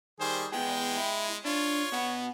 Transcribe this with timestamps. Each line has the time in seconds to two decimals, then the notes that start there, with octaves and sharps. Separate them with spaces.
0.20 D#3 G3 G#4 C5
0.52 E3 G#3 B3 G#4 G5
0.97 E4
1.45 D4 F4 C#5
1.92 B2 B3 F#5